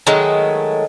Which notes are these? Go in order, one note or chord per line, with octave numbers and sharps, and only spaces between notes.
D#3 F#3 G#3 A3